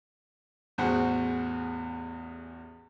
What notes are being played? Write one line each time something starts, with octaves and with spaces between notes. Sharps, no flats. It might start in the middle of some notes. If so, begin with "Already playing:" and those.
A1 E2 F#4 G#4 C5 F#5